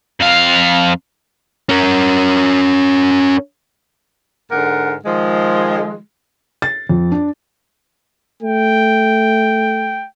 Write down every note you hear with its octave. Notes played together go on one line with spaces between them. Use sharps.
F2 F5
C#4 A#4
G#2 D3 A#4 F#5
D#3 F3 G#3
A6
F2
D4
A3 G5